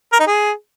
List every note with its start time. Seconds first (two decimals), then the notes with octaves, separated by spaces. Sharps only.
0.13 A#4
0.20 D#4
0.27 G#4